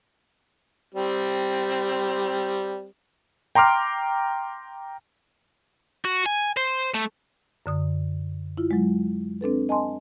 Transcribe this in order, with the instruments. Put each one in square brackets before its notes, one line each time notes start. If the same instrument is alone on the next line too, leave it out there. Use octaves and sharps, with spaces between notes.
[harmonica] G3 C4
[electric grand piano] G5 A#5 C6 D6 F6
[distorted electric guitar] F#4
G#5
C5
A3
[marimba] F#2 D3 D#6
E4 F4
F#3 G#3
C4 D4 A4 B4
D#5 G#5 A5 C6